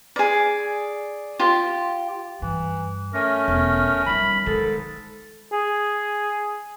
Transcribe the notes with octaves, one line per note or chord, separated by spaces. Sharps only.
G#4 D5
F4 G4
G2 E3
A3 C#4 A#4
E1
G3 D#4 B5
G#2 D#3 G#3 A4
G#4